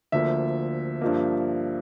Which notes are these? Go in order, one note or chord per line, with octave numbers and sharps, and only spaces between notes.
D2 D3 F3 A#3 E5
G2 F3 A#3